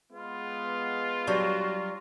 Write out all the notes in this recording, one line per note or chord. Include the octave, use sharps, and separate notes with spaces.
G#3 B3 F4
F#3 G3 D4 F#4